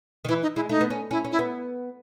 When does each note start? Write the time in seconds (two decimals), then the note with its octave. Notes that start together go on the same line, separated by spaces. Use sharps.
0.25 D#3
0.29 E3 E4
0.42 D#4
0.56 G#3 E4
0.69 A3 D#4
0.81 B3
0.90 C#4
1.11 C#4 E4
1.25 C#4
1.32 E4
1.39 B3